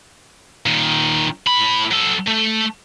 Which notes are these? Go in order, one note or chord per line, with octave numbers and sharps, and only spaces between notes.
A#2 D#3
A2 B5
F#3 A4
A3